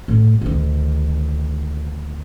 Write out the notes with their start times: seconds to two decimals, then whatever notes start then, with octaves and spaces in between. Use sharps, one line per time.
0.08 A2
0.41 D2 D#3